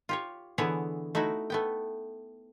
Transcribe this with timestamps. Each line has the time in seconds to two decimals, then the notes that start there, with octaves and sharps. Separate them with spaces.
0.09 F4 G4 C#5
0.58 D3 E3 B3 E4 G#4 C#5
1.15 A3 D#4 E4 F#4
1.50 A3 B3 G5